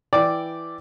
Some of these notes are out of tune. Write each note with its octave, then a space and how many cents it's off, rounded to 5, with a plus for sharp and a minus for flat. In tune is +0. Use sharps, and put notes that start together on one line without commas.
E3 +5 D5 +0 G5 -10